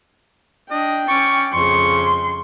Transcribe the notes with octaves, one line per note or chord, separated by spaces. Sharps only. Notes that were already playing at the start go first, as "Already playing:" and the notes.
D4 D#5 G5
C#4 C#6 D6 A6
F2 C#3 C6 C#6